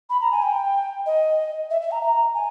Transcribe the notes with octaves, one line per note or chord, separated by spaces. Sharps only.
B5
A#5
G#5
G5
D#5
E5
E5
A#5
A#5
G#5